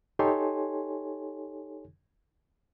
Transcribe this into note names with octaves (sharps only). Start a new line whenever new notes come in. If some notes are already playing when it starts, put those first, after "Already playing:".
D#4 G4 A4 C#5 G#5 C6